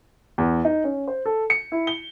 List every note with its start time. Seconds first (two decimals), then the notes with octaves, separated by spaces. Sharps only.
0.38 E2
0.65 D#4
0.84 C#4
1.08 C5
1.26 A4
1.50 C#7
1.72 E4
1.87 G7